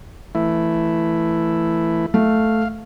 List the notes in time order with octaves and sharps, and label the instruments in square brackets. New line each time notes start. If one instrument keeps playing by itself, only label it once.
[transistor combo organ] E3 A3 E4
[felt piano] A3 [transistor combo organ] F5